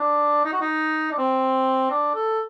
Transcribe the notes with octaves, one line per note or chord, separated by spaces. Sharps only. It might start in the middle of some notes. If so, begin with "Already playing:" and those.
Already playing: D4
D#4
F#4
D#4
D4
C4
D4
A4